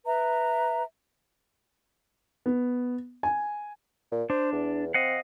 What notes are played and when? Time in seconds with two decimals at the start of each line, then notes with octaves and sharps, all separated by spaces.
0.06 B4 E5 A#5
2.46 B3
3.23 G#5
4.12 A#2
4.30 D4 C5
4.53 E2
4.94 C4 D#5 F5 F#5